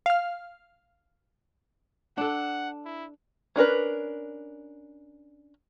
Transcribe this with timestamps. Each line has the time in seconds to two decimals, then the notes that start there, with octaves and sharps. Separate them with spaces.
0.06 F5 F6
2.18 D4 A4 F#5
2.86 E4
3.56 C#4 D4 A#4 B4